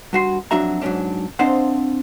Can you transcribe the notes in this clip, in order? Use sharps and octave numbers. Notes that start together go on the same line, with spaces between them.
G2 F#4 C6
F2 F#3 D4 F#4 E5 A#5
G#2 F#3 G#3 C#4 D4
C4 D4 C5 D#5 F5 F#5